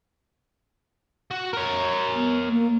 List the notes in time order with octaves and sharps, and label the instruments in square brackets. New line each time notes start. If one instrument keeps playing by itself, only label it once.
[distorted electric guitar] F#4
A#4 C#5
[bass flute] B3
A#3